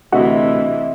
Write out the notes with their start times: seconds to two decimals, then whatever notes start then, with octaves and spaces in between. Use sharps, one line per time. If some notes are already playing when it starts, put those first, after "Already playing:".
0.12 D2 C3 E3 F#4 D#5 E5